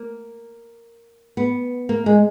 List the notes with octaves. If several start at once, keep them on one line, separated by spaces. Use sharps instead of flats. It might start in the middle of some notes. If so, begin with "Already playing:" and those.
Already playing: A#3
B3
A#3
G#3